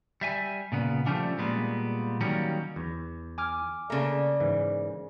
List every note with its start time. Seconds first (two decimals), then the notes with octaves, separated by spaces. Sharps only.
0.21 G3 E5 G#5
0.72 A#2 C#3 B3
1.06 F3 G3 A3 C#4 D4
1.38 A#2 G3 G#3 B3
2.21 D#3 F#3 G3 A#3 C#4
2.76 E2
3.38 G#5 D6 F6
3.90 C#3 A3 A#3 D5 A#5
4.40 G#2 E3